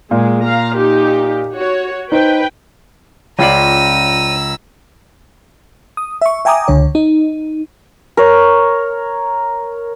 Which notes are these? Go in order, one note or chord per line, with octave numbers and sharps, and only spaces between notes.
A#2 G#3
F5 A#5
D#4 G4
F#4 C#5
D#4 B4 C5 G5
C#2 C#4 F4 D5 A#5 E6 D#7
D#6
E5 C#6
E5 G5 G#5 A#5 D6 D#6
C#2 D3 C#5
D#4
A#4 C#5